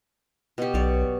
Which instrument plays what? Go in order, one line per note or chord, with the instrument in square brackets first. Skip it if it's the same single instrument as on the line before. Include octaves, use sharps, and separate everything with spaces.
[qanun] B2 G4
[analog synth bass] B1 [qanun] C#5 D5